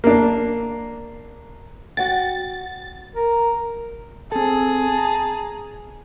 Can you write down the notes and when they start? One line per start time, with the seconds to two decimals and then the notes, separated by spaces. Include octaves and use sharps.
0.04 A#3 D4
1.97 F#4 F#5 G5 A6
3.14 A#4
4.32 C4 G#4 A4 A5
4.98 A#5